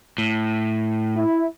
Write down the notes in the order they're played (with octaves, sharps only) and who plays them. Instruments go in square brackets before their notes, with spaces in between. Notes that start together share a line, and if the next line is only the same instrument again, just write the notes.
[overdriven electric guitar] A2
[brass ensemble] E4